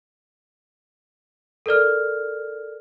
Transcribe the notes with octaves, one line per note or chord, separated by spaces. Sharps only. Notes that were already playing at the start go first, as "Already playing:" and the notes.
A4 A#4 D5 F6